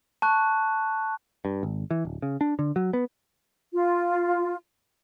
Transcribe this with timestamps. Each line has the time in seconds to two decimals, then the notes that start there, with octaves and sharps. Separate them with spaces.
0.22 A5 C#6 F#6
1.45 G2
1.63 G#1
1.91 E3
2.05 D1
2.22 C#3
2.41 D4
2.59 D3
2.76 F#3
2.93 B3
3.73 F4